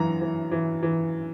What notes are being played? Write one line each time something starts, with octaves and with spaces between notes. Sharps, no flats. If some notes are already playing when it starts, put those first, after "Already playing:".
Already playing: F#2 E3 A#5
E3
E3
E3